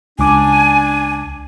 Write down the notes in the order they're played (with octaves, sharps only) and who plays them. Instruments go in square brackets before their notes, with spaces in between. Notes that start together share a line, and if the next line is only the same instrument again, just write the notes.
[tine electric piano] C#2 D6 [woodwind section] D4 [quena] G#5